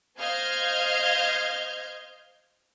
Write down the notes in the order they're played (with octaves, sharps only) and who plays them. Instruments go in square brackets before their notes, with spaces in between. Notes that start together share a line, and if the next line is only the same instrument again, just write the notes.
[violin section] C5 D#5 F5 F6 G6 G#6